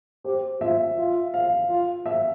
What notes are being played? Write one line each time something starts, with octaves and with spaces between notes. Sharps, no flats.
G4 C5
F4 E5
F4
F5
F4
E5